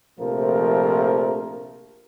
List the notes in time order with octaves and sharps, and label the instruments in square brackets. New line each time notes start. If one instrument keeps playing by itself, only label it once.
[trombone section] A#1 C3 F3 A3 A#4